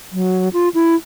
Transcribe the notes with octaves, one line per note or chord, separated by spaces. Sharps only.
F#3
F4
E4